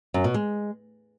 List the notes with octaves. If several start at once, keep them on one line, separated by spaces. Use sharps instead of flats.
F#2
B2
G#3